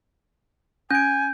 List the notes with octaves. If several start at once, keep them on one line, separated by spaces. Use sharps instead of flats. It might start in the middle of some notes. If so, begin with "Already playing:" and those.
C#4 G#5 G6 D7